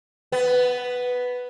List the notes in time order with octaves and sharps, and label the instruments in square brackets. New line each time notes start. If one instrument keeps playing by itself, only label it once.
[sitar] B3